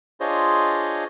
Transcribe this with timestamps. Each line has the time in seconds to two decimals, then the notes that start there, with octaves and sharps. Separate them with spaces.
0.20 D4 F4 G#4 C5 C#5 D#5